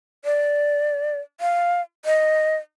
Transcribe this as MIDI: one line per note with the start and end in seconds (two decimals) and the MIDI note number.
0.25 1.20 74
1.41 1.81 77
2.05 2.56 75